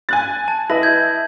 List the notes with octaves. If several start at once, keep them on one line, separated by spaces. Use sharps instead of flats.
G#5 F#6 A6
A5
E4 B4 D#5 A#6 F#7
G6 G#6